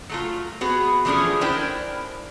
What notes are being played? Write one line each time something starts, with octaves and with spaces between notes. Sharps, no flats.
F#3 A3 F4
B3 F#4 G#4 B4
E3 F3 A3 C#4 D4 G#4
C#4 D4 E4 A#4 C5 G5